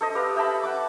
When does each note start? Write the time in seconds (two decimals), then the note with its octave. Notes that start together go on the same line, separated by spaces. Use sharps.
0.01 A4 C5 D#5
0.15 G4 B4 F5
0.36 E5 G5 A5 B5
0.63 F#5 D6